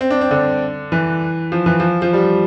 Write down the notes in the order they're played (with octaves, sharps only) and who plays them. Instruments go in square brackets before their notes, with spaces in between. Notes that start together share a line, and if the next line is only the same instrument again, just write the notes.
[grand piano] C4
D4
C4
D3
E3
F3
E3
F3
F3
G3